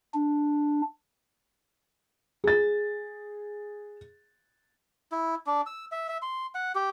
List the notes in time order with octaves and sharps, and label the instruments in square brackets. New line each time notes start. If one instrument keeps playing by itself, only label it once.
[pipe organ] D4
[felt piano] G#4 A6
[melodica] E4
D4
E6
E5
E5
C6
F#5
G4